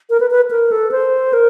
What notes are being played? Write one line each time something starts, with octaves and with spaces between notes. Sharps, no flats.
A#4
B4
B4
A#4
A4
C5
A#4